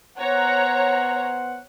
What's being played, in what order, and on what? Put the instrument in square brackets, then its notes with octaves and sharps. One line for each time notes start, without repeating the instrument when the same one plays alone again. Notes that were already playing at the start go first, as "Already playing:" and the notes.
[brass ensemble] B3 C5 F#5 [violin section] C#5 A#5